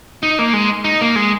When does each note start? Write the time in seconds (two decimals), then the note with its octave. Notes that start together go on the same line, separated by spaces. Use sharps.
0.23 D#4
0.39 A#3
0.53 G#3
0.84 D#4
1.01 A#3
1.16 G#3